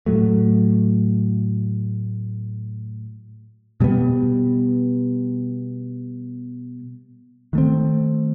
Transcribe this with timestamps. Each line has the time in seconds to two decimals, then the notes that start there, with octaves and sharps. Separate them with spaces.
0.06 A2 F#3 A3
3.80 B2 G3 B3
7.53 D#3 A3 C4